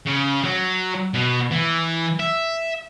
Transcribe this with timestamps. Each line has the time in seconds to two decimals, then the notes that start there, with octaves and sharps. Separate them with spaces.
0.07 C#3
0.44 F#3
1.14 B2
1.52 E3
2.20 E5